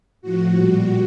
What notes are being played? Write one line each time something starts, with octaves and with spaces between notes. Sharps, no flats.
A2 F3 F#4
A#2 G3